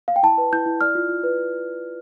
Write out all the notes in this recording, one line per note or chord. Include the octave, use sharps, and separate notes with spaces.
F5
G5
E4 A5
B4
E4 G6
E4
D5 F6
F4
F4
B4